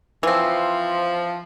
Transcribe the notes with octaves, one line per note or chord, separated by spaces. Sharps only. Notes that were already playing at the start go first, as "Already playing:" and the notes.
E3 F3 C4